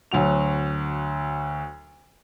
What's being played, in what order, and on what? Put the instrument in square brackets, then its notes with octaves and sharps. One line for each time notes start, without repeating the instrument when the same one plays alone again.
[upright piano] D2 F#3 F#4 F7